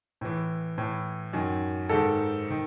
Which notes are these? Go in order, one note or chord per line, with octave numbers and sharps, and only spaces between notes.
A2 E3
A2 E3
F#2 D#3
G#2 D#3 A4
D#3